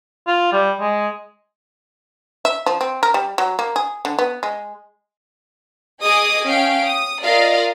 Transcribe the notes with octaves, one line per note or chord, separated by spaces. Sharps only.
F4
G3
G#3
E5
F3
C4
A#4
G3
F#3
A#3
G#4
D3
B3
G#3
G#4 D#5 G#5 D6 D#6
C#4 F5 G5 D7
D#6
F4 A#4 D5 D#5 F5